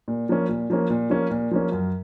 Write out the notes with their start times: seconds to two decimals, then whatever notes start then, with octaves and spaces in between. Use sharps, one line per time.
0.08 A#2
0.29 F3 A#3 C#4
0.49 A#2
0.70 F3 A#3 C#4
0.90 A#2
1.10 F3 A#3 C#4
1.31 A#2
1.51 F3 A#3 C#4
1.72 F#2